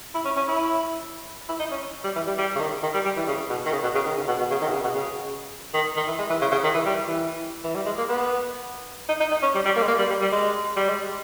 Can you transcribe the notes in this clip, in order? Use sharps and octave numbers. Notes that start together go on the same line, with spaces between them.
E4
C#4
C#4
E4
E4
D#4
C#4
G3
E3
G3
G3
C#3
D#3
D#3
G3
G3
E3
C#3
B2
D#3
C#3
B2
C#3
D#3
C#3
B2
B2
C#3
D#3
B2
C#3
B2
C#3
D#3
D#3
E3
G#3
E3
C#3
C#3
D#3
E3
G3
E3
E3
G3
G#3
A#3
B3
D#4
D#4
D#4
C#4
G3
G3
A#3
G#3
A#3
G3
G3
G3
G#3
G3
G#3